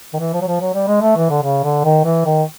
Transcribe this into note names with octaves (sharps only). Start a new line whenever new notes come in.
D#3
E3
F3
F#3
F3
F#3
G3
G#3
A3
E3
D3
C#3
D3
D#3
E3
D#3